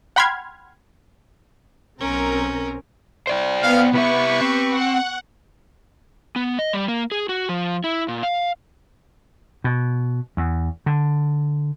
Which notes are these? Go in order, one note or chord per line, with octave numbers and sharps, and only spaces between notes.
F#5 G5 B5 C6 F6 G#6
B1 C4 C#4 A#4
C5 D5 G5
B3 F5
C3 E4 G4 B4 E5 C#6
C4
F#5
B3
D#5
G3
A#3
G#4
F#4
F3
E4
A#2
F5
B2
E2
D3